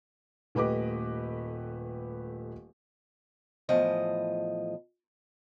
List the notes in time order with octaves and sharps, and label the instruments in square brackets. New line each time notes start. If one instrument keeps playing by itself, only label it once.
[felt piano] D#1 A3 G4 B4 D#5 D6
[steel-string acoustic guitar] E2 A2 F3 D#5